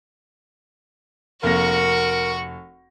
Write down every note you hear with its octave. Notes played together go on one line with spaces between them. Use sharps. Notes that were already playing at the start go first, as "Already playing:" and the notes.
F1 A#3 F#4 A#4 C#6 A#6